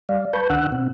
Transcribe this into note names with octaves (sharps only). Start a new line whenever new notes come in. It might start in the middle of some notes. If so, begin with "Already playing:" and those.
G3 D5 F5
B4 A5 B5 C#6 G6
D2 D#3 D4 F#5 E6 F#6
B2 C4